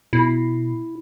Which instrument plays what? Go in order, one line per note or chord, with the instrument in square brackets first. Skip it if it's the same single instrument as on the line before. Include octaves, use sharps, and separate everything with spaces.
[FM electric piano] B2 [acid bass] E4